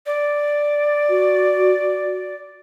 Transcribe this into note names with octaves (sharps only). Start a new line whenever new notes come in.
D5
F#4